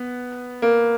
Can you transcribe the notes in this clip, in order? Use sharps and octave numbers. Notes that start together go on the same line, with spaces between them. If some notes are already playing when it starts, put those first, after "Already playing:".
Already playing: B3
A#3